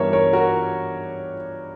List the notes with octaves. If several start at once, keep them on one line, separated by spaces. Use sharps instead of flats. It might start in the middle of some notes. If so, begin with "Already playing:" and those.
Already playing: G2 E3 G3 B3 A#4 C#5 E5
A#4 C#5
F#4 A#4